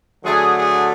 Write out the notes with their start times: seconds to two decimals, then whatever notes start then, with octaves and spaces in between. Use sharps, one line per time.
0.24 D3 F#3 A3 G#4
0.55 G#4